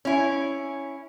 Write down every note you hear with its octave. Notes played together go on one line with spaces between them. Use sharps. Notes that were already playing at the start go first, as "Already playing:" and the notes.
C#4 E4